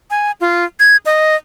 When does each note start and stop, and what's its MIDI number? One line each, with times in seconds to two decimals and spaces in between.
0.10 0.31 80
0.41 0.65 65
0.80 0.97 92
1.06 1.35 75